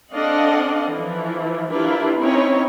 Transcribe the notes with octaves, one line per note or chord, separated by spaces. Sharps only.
C4 D4 A4 D#5 F5 F#5
E3 F3
D4 E4 F4 G4 A#4 B4
C4 C#4 D#4 E4 C#5